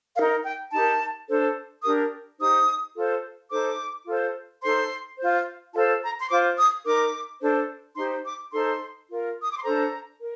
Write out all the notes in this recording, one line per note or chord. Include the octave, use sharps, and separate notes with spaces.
D#4 A#4 F5
G5
D#4 G4 A#4 A5
D4 A4 C5
D4 G4 A#4 D#6
D#4 G4 C5 D#6
F4 A4 C5
D#4 A4 C5 D6
F4 A4 C5
D#4 A4 C5 C6
F4 C5
F4 A4 C5 A5
A#5
C6
F4 C5 D6
D#6
D#4 A#4 D6
D4 A4 C5
D#4 G4 C5 C6
D6
D#4 A4 C5 C6
F4 A#4
D#6
D6
C6
D4 A4 C5 A#5
A#4